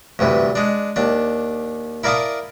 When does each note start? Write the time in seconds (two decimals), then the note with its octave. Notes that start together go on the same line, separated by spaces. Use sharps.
0.19 D2 G2 C3 E3
0.55 G#3 D4
0.96 D#2 D4
2.04 E4 A#4 D5 F5 A5 D#6